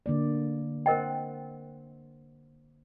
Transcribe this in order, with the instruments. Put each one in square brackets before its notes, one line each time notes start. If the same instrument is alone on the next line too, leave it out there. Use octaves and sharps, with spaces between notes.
[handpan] D3 A#3 D5
[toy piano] A#4 D#5 G5 [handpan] C5 F#5